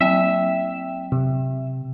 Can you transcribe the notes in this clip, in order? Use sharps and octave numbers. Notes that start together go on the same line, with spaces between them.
F#3 C4 E5 G5
C3